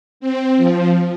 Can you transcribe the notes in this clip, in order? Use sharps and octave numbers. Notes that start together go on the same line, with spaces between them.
C4
F3